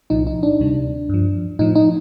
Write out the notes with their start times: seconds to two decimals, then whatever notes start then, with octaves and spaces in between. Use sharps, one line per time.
0.10 C2 A#2 F3 D#4
0.27 D#4
0.43 D4
0.60 D2 C3 G3
1.09 G2 F3
1.59 A2 F3 D#4
1.75 D#4